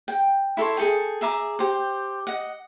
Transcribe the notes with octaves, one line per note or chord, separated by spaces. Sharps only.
G5
E4 A4 C#5 C6
G#4 A4 G5
G#4 E5 A#5 D6
G4 C5
D#5 F#5